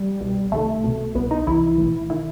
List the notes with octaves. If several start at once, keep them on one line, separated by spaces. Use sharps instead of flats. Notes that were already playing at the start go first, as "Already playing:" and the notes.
Already playing: G3
C2 B2
C2 C3 D#3 A3
C2 B2
C2 B2 B3
D#4
C2 C3 E3 E4
B1 A2 E3
D#3 E4